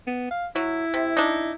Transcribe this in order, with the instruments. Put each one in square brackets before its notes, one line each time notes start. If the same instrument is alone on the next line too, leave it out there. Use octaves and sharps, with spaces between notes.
[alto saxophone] B3
F5
[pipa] F#3 [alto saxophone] E4
[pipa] C3
D4 D#4